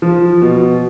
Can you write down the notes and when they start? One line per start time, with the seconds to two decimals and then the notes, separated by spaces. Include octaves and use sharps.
0.02 F3
0.42 B2